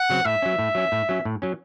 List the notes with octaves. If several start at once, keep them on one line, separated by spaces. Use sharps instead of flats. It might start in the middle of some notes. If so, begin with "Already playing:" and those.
Already playing: F#5
C#3 F#3 C4
A2 E5
F#3 C#4
A2
F#3 C#4
A2
F#3 C#4
A2
F#3 C#4